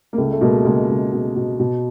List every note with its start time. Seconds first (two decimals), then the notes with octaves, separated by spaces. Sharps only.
0.13 A#3
0.18 C#2 A3
0.32 A3
0.41 B2 G#3 A#3
0.65 C#2 G#3 A#3
0.89 C#2
1.12 B2
1.36 B2
1.59 B2